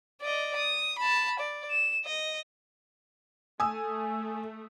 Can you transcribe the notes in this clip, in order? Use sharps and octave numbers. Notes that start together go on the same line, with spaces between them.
D5 D#5
D#6
A5 B5
D5
E7
D#5
A3 G#5 D#6 E6